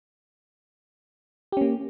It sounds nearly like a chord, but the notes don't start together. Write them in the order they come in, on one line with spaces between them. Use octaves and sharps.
G4 C#4 A#3